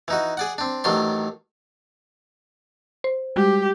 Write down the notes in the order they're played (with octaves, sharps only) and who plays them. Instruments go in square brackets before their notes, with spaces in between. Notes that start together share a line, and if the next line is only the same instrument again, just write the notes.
[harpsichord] E3 D#4 F#4
G#4 D5 F#5
C4 D4
A1 D#3 F#3 D4 C6
[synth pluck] C5
[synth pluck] G3 G#3 F#4 [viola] G4